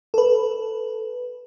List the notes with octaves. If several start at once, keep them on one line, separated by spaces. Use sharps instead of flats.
A4 B4